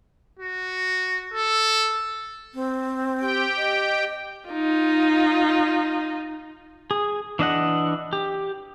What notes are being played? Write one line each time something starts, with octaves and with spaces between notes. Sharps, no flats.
F#4
A4
C4
G4 G5
D#5
D#4 F4
G#4
E3 D4 D#5 F#5
G4